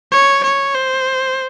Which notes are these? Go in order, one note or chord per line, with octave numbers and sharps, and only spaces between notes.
C#5
C#5
C5